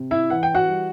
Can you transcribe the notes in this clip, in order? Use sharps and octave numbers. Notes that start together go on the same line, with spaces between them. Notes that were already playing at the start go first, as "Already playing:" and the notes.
Already playing: C3
E4 E5
E3 F#5
G5
F#4 F#5
G3